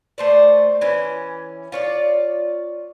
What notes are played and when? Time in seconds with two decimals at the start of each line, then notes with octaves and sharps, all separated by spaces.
0.18 A3 C5 D5
0.81 E3 C#4
1.72 F4 C#5 D5